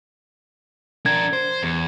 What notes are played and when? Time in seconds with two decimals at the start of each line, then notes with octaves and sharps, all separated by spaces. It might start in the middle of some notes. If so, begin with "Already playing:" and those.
1.06 D4 A#4 G#6
1.33 C5
1.63 E2